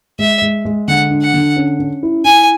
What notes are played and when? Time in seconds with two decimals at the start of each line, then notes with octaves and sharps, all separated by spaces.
0.19 G#3 E5
0.42 G#3
0.65 G#3
0.88 D3 F#5
1.11 D4
1.22 F#5
1.34 D3
1.57 C#4
1.79 C#4
2.03 E4
2.25 E4 G#5